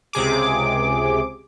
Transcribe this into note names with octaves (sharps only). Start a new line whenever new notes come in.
C#2 C3 G#4 D6